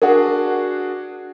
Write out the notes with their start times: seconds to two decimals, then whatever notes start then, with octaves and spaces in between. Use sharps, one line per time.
0.02 D4 F#4 G#4 A#4 F#5